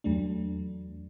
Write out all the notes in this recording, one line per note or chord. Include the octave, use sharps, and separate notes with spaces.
E2 F#3 A3 D4